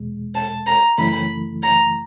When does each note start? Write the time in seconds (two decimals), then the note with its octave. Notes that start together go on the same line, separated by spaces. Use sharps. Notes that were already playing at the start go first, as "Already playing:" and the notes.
Already playing: E2 B2 G#3
0.35 A5
0.66 A#5
0.98 F#2 C#3 E3 A3 B5
1.62 A#5